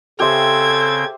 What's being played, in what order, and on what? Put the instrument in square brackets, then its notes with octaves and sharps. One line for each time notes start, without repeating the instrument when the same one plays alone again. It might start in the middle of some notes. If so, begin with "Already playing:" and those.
[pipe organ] C#3 C4 G5 [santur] G4 C5 E5 [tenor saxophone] A4 [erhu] G#6